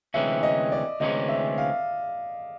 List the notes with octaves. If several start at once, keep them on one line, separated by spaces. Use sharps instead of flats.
D2 C3 E3 G#3 C#4 E5
D#5
D5
D2 C3 E3 G#3 C#4 D#5
E5
F5